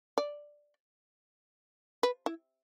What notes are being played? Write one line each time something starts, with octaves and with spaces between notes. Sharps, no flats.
D5
B4
E4